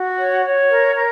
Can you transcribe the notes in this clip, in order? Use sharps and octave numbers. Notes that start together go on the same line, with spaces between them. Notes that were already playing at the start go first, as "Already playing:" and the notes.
Already playing: F#4
C#5
C#5
A#4
A#4